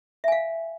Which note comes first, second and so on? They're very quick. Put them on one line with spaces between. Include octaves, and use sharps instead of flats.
E5 G#5 F5